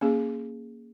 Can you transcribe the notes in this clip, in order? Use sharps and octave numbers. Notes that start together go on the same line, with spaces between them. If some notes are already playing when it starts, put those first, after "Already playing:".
A#3 C#4 G#4